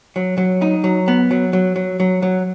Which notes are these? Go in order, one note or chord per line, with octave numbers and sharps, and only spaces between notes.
F#3
F#3
D#4
F#3
B3
F#3
F#3
F#3
F#3
F#3